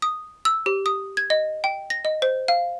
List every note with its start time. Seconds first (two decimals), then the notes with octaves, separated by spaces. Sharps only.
0.02 D#6
0.45 E6
0.66 G4
0.86 D#6
1.17 G#6
1.30 D#5
1.64 G5
1.90 A#6
2.05 D#5
2.22 C5
2.48 F5